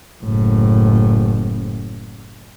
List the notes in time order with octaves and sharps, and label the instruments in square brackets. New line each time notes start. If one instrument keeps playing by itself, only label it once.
[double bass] F#1 A2